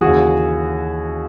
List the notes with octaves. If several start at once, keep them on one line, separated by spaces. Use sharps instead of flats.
D#2 C#3 E3 F#4 G#4